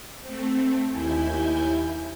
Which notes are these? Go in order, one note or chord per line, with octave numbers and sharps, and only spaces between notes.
A3 C4
D#2 E4 G#5 G6